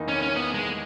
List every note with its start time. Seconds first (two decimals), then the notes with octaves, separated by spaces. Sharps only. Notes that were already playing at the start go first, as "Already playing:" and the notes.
Already playing: E2 D#3 A#3 D#4
0.08 C#4
0.22 C#4
0.36 B3
0.55 G#3